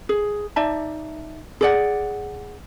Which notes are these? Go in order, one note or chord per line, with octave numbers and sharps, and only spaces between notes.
G#4
D#4 D5 E5 A5
G#4 D5 F#5